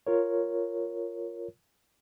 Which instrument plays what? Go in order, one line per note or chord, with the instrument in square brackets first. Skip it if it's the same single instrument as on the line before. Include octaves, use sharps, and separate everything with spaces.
[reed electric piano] F4 A#4 C#5